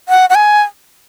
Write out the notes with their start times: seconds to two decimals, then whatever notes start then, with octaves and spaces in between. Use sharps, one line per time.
0.09 F#5
0.30 F#5
0.35 G#5